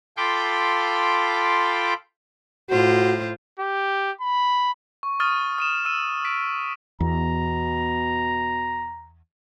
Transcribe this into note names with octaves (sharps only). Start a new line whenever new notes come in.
F4 A4 G5 B5 C6 D6
A2 F4 F#4 C5
G4
B5
C#6
C#6 D#6 F6 A6 D#7
D#6 D#7 E7
E6 D#7
B6 D7
E2 B2 A#5